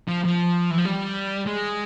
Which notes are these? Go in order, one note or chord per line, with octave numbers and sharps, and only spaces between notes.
F3
F3
E3
F3
G3
G#3